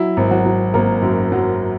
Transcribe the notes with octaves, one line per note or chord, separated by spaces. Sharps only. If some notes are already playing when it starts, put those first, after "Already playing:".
Already playing: F#3 E4
G#1
F#3 F#4
F#3
G#1 A#3 A#4
F#2
F#3